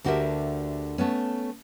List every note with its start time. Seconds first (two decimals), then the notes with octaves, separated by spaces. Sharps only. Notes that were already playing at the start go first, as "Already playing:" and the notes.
0.04 D2 D3 F#4 G4 A#4 E5
0.98 A3 B3 C#4